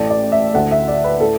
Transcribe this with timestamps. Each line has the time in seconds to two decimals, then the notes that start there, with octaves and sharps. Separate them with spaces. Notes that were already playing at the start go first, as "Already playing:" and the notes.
Already playing: A1 A2 A3 D5
0.10 D5
0.32 E5
0.53 D2 D3 A3 F#5
0.71 E5
0.88 D5
1.04 B4
1.20 A2 A3 A4